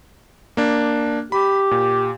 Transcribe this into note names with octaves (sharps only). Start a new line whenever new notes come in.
A#3 D4
G4 B5
A#2